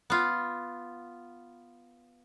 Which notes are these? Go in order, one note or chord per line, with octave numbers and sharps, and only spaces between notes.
B3 F4